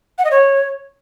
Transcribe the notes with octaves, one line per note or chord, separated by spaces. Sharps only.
F#5
D#5
C#5